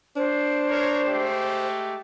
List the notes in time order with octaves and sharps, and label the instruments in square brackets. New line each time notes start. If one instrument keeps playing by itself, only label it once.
[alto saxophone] D4 [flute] C5
[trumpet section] A#4 C#5
G#3 A3 G4